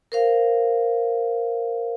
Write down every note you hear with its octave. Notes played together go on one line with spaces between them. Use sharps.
A#4 C5 F5